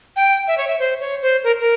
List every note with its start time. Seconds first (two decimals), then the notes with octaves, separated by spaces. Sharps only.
0.16 G5
0.47 E5
0.58 C#5
0.67 E5
0.79 C5
1.01 C#5
1.22 C5
1.44 A#4
1.60 A#4